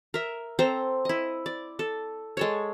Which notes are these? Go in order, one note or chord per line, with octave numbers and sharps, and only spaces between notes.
A#4 E5
C4 A4 C5 A#5
E4 D#5
D5
A4
G#3 A4 C#5